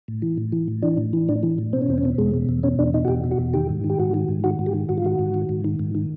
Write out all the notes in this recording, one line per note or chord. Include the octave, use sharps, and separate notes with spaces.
A2
E3
A2
E3
A2
E3 D4
A2
E3
A2 D4
E3
A2
B2 C4
C#4
E2 C4
C#4
B2 C4
E2 G#3
B2
E2
B2 C#4
E2 D4
B2 D#4
F#4
E2 G4
B2
F#4
E2
D#3 G4
G#2
D#3
G4
G#2 F#4
D#3
G#2
D#3 F#4
G#2
G4
D#3
G#2 F#4
F4
D#3 F#4
G#2
D#3
G#2
D#3
G#2
D#3